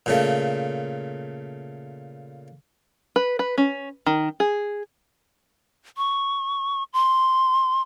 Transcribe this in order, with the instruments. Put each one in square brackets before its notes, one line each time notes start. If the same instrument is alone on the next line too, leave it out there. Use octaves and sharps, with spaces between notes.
[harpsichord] A#2 C#3 A3
[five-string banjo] B4
B4
C#4
D#3
G#4
[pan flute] C#6
C6